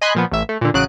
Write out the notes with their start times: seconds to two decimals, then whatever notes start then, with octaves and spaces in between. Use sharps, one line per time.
0.02 D#5 G#5 B5 C6 F#6
0.15 A#2 F3 B3
0.31 A1 E5
0.49 A3
0.61 A#2 D3
0.74 A1 C#3 F#3 F#6 D7 D#7